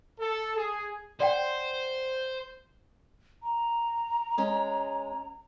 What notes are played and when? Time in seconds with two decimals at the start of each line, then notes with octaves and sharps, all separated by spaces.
0.20 A4
0.56 G#4
1.20 C5 D5 F#5 G5
3.43 A#5
4.38 G#3 C#4 D#5